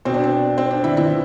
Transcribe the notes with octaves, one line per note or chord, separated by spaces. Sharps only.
B2 C4
D4
C4
C4
D4
E3 E4
E3 E4
E3